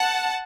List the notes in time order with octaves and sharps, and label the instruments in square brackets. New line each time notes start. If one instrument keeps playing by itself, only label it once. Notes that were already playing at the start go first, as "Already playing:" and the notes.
Already playing: [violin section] F#5 A5